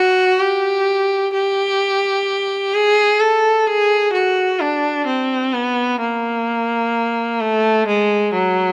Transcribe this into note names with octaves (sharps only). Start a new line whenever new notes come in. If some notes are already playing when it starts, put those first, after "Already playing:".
Already playing: F#4
G4
G4
G#4
A4
G#4
F#4
D4
C4
B3
A#3
A3
G#3
F#3